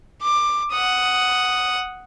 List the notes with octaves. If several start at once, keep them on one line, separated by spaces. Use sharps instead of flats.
D6
F#5 D#6